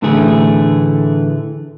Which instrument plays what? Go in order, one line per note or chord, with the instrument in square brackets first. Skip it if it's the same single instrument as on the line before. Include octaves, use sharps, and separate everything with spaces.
[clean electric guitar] A2 D3 E3 A3 G#4